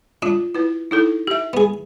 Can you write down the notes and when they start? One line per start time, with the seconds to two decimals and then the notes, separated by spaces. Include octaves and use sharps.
0.22 D4 F4
0.54 E4 B4
0.91 D#4 E4 A4
1.27 G4 E5
1.53 B3 G#4